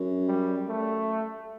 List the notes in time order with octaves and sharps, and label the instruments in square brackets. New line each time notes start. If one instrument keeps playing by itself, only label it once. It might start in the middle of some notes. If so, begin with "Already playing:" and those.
Already playing: [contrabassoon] F#2
[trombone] G3
A3